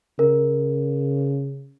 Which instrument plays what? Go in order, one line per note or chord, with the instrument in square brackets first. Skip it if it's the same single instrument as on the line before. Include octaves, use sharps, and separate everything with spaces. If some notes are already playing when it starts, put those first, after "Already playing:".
[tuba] C#3 [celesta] A#4